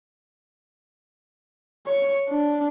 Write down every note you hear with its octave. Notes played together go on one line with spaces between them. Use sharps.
C#5
D4